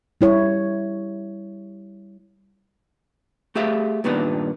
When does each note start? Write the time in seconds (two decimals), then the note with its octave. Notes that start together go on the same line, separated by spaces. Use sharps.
0.21 G3 E4 C#5
3.55 A3 G4 G#4 E5 F5
4.04 G2 A#2 D#3 B3 D4